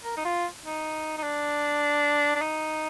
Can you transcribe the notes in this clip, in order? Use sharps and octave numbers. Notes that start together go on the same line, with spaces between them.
A#4
D#4
F4
D#4
D#4
D4
D4
D#4